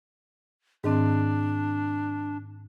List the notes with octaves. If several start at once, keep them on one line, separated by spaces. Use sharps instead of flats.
G#2 D#3 C4 D4